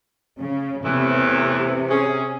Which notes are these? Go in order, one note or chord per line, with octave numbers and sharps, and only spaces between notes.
C#3
E2 A2 C3 E3
C#4 G#4